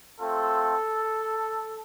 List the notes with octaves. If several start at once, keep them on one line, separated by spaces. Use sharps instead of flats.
A3 C4 F4 A4